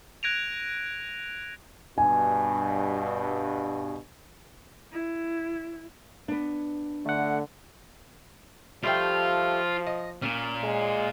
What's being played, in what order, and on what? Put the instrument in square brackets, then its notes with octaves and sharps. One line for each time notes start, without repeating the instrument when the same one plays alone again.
[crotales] F#6 G#6 A#6 D7 D#7 F7
[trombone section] G2 B2 [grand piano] G#5
[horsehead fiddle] E4
[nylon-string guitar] B3 D4
[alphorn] D3 [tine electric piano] A3 F#5
[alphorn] F3 [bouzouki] G3 A3 G5 [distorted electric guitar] F4
[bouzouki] D#5
[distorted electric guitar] A#2 [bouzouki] C#4
[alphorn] G#3